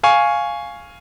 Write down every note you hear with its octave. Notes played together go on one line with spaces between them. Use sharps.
F5 G#5 C#6